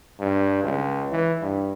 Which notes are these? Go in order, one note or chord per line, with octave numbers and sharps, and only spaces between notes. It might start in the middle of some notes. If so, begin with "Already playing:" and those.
G2
C#2
E3
G2